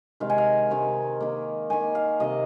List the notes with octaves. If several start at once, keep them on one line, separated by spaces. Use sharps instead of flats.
C3 D#3 G#3 F5
G#5
F5
C3 D#3 G#3
D#3 A#3
D#3 A#3 G#5
F5
C3 D#3 A#3 D#5